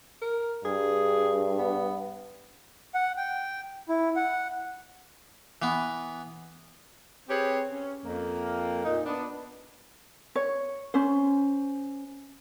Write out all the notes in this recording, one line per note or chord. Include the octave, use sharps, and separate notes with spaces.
A#4
G2 G#4
B3
F#5
G5
E4
F#5
E3 B3
C4 G4 G#4 B4 C#5
C#4
F2 A#3
A#2 D#4
B3 D4
C#5
C#4 C5